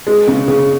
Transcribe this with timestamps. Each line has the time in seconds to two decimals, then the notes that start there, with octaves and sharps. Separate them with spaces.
0.07 G#3
0.27 C#3
0.48 C#3